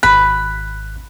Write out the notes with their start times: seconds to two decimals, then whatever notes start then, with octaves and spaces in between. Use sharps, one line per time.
0.03 G#1 B5 F#6